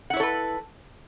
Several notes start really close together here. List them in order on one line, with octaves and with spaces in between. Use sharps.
F#5 E4 C#5 A4 B4